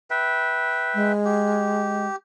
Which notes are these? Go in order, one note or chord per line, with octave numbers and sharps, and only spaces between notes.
B4 E5 G5
G#3
G4